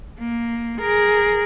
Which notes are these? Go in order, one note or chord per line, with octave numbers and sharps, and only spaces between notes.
A#3
G#4 A#4